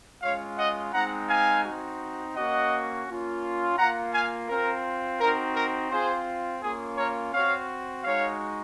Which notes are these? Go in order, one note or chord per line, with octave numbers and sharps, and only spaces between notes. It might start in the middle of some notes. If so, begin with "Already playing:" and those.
G#3 C#4 F4 C#5 F5
D#5 F#5
G#3 C4 D#4 F#5 A#5
F5 G#5
C4 D#4 F#4
A#3 C#4 F#4 D#5 F#5
A#3 C#4 F4
A#3 F4 F#5 A#5
F5 G#5
C4 F4 A#4
C4 D#4 F#4 A#4
A#4
C4 F4 G#4 C5
A#3 C#4 F4 G#4
A#4 C#5
C4 F#4 C#5 F5
G#3 D#4 F#4 C#5 F5